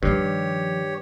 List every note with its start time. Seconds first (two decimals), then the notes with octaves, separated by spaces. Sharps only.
0.03 G2 D#3 F3 G4 C#5